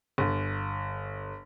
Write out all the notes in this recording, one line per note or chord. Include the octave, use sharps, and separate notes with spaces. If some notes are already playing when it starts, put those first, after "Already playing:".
G1